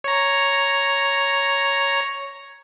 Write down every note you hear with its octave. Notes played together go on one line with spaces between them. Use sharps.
C#5 A#5